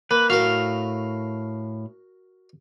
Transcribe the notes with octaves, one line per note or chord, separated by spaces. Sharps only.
A#3 B4
A2 F#4 A#4 F5